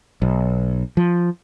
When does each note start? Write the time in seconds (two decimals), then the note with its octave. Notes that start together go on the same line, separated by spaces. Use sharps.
0.22 B1
0.97 F3